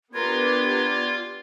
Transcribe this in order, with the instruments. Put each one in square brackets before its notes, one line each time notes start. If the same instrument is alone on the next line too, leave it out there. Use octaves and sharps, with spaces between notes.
[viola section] B3 D4 G4 [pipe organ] F4 [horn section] A#4 B4 [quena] G#6